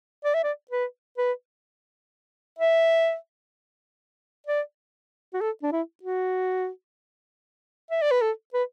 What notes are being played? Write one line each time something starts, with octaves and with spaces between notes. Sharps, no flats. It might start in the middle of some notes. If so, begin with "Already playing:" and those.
D5
E5
D5
B4
B4
E5
D5
F#4
A4
D4
E4
F#4
E5
D5
B4
A4
B4